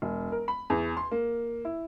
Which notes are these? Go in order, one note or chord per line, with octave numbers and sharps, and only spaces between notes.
E1
A#4
B5
E2
C6
A#3
E4